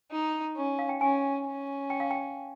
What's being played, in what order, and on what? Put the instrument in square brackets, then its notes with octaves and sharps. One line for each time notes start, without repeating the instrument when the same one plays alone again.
[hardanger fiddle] D#4
C#4
[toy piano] F5
G5
[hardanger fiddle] C#4 [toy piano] G#5
[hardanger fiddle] C#4
[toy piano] G5
F5
G5